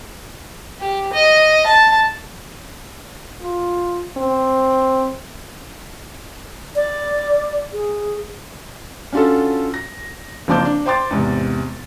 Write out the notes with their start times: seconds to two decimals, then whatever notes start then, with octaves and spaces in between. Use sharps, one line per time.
0.80 G4
1.13 D#5
1.66 A5
3.42 F4
4.17 C4
6.76 D5
7.73 G#4
9.13 C#4 D4 F4 F#4 A4
9.74 A#6
10.48 F#1 F3 C4 A5 D6 G6
10.65 D4
10.86 C5 G5 C6 D6 A6
11.11 E2 G#2 C3